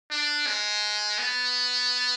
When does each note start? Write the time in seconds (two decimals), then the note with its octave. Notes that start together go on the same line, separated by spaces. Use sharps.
0.11 D4
0.46 G#3
1.19 B3